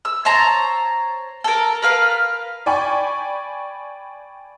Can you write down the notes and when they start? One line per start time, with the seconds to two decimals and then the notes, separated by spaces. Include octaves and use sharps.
0.05 E6
0.25 C5 C#5 A5 A#5
1.44 A4 A#4
1.82 A#4 B4 F5
2.66 D5 G5 G#5 B5 C#6